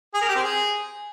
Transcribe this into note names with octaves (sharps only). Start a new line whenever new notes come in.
G#4
A#4
G4
C4
G#4